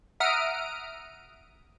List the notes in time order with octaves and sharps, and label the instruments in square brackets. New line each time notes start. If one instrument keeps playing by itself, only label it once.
[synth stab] E5 F#5 A#5 D#6 F6 D7